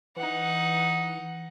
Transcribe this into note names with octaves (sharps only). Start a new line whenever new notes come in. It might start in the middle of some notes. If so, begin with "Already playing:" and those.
E3 D#4 F#5